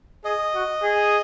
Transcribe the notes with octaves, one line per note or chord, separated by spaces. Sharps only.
G#4 D#5
F#4
G#4